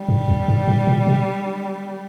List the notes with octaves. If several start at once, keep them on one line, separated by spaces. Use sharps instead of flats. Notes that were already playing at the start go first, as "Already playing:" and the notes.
Already playing: G3
G2
E2
G2
G#2
A#2
B2